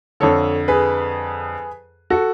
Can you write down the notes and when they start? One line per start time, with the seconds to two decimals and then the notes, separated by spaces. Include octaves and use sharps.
0.20 F2 D3 A4 C#5
0.68 G#4 B4
2.10 F#4 A4